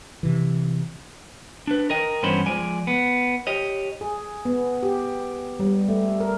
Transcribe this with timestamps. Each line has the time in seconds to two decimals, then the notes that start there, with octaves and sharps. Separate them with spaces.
0.23 C3 E3
1.67 D4 B4
1.90 A#4 D#5 G5
2.23 G2 E3 B3 C#4 C5 B5
2.46 F3 G#3 D5 G#5
2.87 B3
3.47 G4 C#5 D#5
4.01 G#4
4.45 B3
4.83 G4
5.60 G3
5.88 A3
6.20 A#4